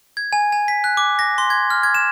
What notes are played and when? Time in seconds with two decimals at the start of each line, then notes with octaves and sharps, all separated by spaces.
0.17 G#6
0.33 G#5
0.52 G#5
0.68 B6
0.84 F#6
0.97 D6
1.19 A#6
1.38 C6
1.50 G#6
1.70 F6
1.83 G#6
1.95 E7